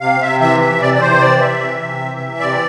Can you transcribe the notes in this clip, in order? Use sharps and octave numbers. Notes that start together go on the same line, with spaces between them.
C3 F5
C3 E5
E3 E5
E3 E5
C3 D5
D5
C3 C5
E3 D5
E3 E5
C3
C3
E3
E3
C3 D5